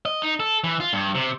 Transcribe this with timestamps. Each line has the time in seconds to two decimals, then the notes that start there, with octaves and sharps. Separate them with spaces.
0.05 D#5
0.23 D#4
0.40 A4
0.64 E3
0.80 F4
0.93 G2
1.15 C3